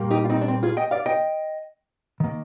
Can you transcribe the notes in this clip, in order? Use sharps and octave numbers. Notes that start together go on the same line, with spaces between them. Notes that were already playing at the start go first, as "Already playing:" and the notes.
Already playing: A#2 G3 A#3
D#4 G4
F4
C4 D#4
D4
C4
F4 G#4
D#5 G5
D5 F5
D#5 G5
D#3 A#3